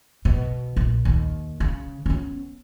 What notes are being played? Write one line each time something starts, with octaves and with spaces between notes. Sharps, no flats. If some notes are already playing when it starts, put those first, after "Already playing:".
B2
A#1
D#2
C#3
B3 C#4